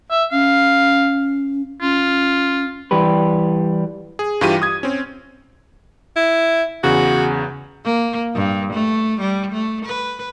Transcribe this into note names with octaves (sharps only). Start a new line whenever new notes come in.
E5
C#4 F5
C#4 F4
E3 G3 G4 B4
G#4
G2 E3 G3 F4 G4 D#7
D#6 G#6
C4 C#4
E4
E2 C#3 F#4
A#3
G2
A3
G3
A3
B4